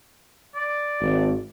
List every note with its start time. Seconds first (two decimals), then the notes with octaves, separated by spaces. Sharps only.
0.55 D5
1.00 G#1